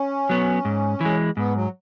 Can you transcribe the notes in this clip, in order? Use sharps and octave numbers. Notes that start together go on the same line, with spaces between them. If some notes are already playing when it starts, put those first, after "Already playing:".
Already playing: C#4
F#3 B3
G#2
E3 G#3
G#2 B3
F#3